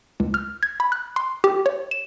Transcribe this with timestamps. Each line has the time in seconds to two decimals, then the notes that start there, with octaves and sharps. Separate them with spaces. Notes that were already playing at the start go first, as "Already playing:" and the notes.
0.20 C#2
0.34 F6
0.63 G#6
0.80 B5
0.92 F#6
1.16 C6
1.44 G4
1.66 C#5
1.91 E7